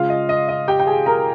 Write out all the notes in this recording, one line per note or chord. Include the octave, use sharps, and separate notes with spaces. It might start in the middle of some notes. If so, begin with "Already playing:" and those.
Already playing: C#3 G#3 F4 F5
D#5
D#5
D#5
G4 G5
G5
G#4 G#5
A#4 A#5